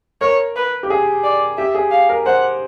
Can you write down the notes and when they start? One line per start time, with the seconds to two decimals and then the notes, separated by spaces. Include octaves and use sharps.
0.21 A#4 C#5
0.56 B4
0.83 G4
0.90 G#4
1.24 D5
1.57 G4 E5
1.75 G#4
1.91 F5
2.09 A#4
2.26 C5 F#5